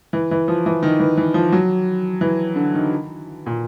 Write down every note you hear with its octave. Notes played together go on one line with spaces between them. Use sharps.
E3
E3
F3
E3
D#3
E3
E3
F3
F#3
E3
D3
D#3
A#2